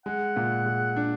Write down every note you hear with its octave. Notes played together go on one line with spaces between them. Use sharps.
G#3 F#5
A#2
G#3
D4